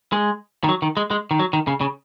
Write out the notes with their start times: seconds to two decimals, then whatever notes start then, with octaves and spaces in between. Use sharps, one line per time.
0.13 G#3
0.64 D#3
0.69 F#3
0.82 D#3
0.97 G#3
1.11 G#3
1.31 D#3
1.39 F#3
1.53 D#3
1.67 C#3
1.81 C#3